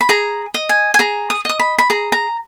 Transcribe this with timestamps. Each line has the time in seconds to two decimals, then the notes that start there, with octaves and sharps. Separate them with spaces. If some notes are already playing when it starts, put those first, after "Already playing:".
0.01 B5
0.09 G#4 A#5
0.54 D#5
0.69 G#5
0.94 G#5
0.99 G#4 A#5
1.30 D#6
1.45 D#5 D#6
1.60 B5
1.78 B5
1.90 G#4 A#5
2.12 A#5